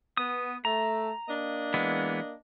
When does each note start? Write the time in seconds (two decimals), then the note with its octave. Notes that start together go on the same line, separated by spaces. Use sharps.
0.17 B3 D#6
0.65 A3 A#5
1.28 A#3 D4 D#5
1.74 E3 G#3 B3